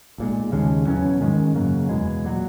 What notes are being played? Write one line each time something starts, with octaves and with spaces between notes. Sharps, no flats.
B1 A#2 G#3
D#2 C#3 G#3
E2 B2 F#3 C#4
G#2 D#3 G#3 C#4
F#2 C#3 F#3 A#3
E2 B2 G#3
A#2 F#3